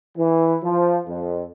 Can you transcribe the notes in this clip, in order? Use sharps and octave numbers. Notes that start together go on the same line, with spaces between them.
E3
F3
F2